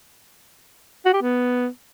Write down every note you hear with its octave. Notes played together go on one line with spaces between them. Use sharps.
F#4
G4
B3